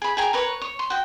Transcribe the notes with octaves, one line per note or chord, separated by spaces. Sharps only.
G#4 B5
G#4 G5 G#5 A#5
A#4 B4 C#5
C#5
C6
F#4 G5